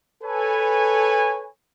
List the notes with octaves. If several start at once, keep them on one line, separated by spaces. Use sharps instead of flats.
A4 B4 C#5 G#5